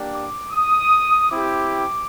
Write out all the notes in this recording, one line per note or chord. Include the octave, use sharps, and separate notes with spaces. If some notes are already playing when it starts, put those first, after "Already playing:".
Already playing: A#3 D4 G4
D6
D#6
C4 E4 G4 D6